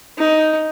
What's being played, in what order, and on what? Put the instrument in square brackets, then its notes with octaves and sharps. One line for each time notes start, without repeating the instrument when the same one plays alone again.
[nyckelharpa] D#4